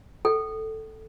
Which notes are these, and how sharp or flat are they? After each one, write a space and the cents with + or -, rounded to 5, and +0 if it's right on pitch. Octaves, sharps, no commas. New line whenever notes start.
A4 +0 G5 -45